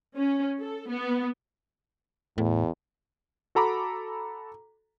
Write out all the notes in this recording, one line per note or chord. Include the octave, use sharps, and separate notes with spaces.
C#4
A4
B3
E2 A2
F#4 A4 A#5 B5 D6